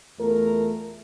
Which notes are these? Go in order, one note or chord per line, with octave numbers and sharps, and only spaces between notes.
E2 A3 F4 A#4